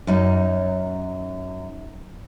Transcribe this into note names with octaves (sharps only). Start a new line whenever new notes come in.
F#2 C#4 D#4